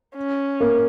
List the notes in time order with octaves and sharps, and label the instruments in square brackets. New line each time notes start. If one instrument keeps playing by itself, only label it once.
[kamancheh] C#4
[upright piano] A#3